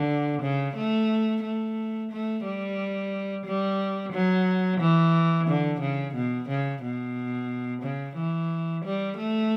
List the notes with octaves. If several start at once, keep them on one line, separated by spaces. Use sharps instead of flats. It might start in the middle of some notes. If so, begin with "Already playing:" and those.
Already playing: D3
C#3
A3
A3
A3
G3
G3
F#3
E3
D3
C#3
B2
C#3
B2
C#3
E3
G3
A3